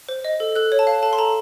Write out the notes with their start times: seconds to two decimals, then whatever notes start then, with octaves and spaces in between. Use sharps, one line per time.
0.09 C5
0.24 D#5
0.40 A4
0.55 A4 F#6
0.72 C#5
0.79 A5
0.87 F5
1.03 A4 A5
1.13 C6
1.18 A4 A#5